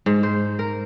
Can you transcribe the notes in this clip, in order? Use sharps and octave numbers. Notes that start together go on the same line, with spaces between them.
G#2
C5
A#4